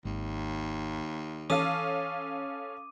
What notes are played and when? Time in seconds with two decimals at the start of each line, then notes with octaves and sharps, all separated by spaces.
0.05 G#1 D#2
1.50 E3 C#4 A4 F5 D6 D#6 D#7